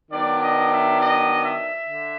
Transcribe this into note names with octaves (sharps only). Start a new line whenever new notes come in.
D#3 F#3 B3 D4 D5
D#5
E5
D#5
E5
D3